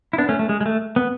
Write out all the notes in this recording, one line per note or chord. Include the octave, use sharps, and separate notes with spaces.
E4
B3 D4
A3 C#4
A3
G#3
G#3
A3
B3